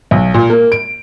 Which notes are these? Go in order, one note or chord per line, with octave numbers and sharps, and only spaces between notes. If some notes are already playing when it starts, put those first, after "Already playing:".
B1
A#2
A#3
D7